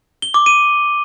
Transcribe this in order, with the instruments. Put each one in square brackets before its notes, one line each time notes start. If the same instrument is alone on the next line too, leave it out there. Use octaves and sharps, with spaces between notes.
[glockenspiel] G7
D6
D#7